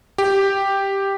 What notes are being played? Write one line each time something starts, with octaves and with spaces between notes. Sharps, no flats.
G4